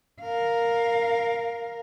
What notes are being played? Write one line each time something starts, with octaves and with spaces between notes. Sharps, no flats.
A#4 F5